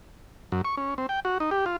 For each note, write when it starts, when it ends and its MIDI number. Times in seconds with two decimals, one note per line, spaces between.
0.52 0.62 42
0.65 0.76 85
0.77 0.94 61
0.98 1.06 60
1.09 1.20 79
1.25 1.38 66
1.40 1.50 63
1.51 1.65 67
1.66 1.76 65